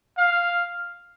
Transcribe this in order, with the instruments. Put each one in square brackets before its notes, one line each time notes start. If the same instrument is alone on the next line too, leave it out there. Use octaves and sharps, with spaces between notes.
[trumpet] F5